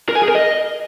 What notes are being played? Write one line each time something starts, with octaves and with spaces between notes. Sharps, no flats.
A#4
G#5
G#4
A#4
D#5